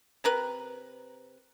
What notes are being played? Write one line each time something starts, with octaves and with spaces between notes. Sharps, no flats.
C3 A#4 B4